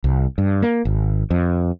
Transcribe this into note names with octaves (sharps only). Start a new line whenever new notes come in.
C2
G2
A#3
G#1
F2